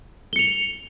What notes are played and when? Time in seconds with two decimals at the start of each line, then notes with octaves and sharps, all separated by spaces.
0.33 G7
0.36 C#7
0.39 F7